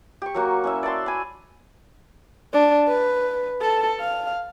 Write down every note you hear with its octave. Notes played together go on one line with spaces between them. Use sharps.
G4 C#6
F#3 A#3 F#4
C#4 E4 E5
D5 E5 A5 C6
G#5 B5
D4
B4
A4
F5